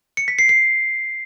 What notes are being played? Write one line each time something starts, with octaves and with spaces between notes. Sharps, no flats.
C#7
B6
C7
C7